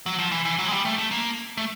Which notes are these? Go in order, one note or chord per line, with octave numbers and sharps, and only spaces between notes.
F#3
F3
E3
E3
F#3
G#3
G3
A3
A3
A#3
A3